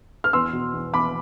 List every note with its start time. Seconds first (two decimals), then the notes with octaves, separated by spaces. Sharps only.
0.24 F6
0.33 E2 C6 E6
0.53 B2
0.74 E2
0.94 E2 B5 D6